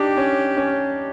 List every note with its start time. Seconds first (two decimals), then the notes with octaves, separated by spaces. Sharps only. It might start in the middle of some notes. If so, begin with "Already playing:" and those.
Already playing: D4 D#4 G4
0.17 C#4
0.57 C#4